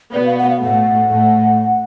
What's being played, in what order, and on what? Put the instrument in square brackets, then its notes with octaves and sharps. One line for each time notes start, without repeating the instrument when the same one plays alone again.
[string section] B2 B3 [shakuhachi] D5
[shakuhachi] F5
F#5
F5
[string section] A2 A3 [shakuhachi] F#5
[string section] A2 A3